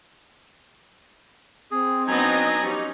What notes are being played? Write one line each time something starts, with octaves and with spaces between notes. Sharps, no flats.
C4 G#4
F#3 B3 D4 D#4 D#5 G#5 A#5
F3 C#4 D#4 G4